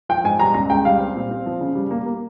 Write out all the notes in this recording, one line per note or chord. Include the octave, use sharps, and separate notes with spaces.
F3 G5
G#2 G#5
G3 A#5
C#2 A#5
C#2 G5
G3 F5
C4
A#2
C4
F3
C#3
G3
A#3
A#3